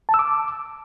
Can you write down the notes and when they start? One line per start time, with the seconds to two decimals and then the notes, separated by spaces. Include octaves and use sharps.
0.09 A5
0.14 E6
0.19 D6